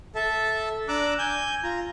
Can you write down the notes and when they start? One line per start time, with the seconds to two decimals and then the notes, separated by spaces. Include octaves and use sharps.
0.15 A4 E5 A5
0.88 D4 A#5 D6 E6 F#6
1.19 G#5 G6
1.63 F4 A#5